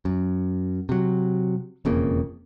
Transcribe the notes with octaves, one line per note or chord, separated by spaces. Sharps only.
F#2
C3 F#3
E1 F2 C#3 A#3